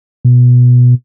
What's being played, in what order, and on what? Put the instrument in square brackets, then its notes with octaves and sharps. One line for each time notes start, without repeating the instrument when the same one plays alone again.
[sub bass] B2